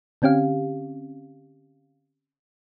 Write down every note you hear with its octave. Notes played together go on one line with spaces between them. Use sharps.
D3 C4 C#4 G4 F5